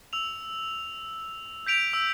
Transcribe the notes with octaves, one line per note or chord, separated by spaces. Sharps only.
E6 F7
G6 B6 D7 F7
E6